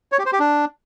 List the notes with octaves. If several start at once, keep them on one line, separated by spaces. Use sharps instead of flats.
C#5
G4
C5
G4
D4